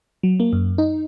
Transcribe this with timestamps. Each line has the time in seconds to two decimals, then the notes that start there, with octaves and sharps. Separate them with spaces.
0.23 F#3
0.40 A#3
0.53 F#2
0.78 D#4